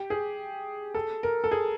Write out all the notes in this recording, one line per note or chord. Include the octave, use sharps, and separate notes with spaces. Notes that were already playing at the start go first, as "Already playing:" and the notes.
Already playing: G4
G#4
A4
A#4
A4
G#4